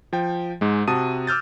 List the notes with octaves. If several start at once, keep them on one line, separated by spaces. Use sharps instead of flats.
F3 G5
G#2 G#3
C3 F#4 A5 D#6 D#7
D6 E6 F6 G6 A6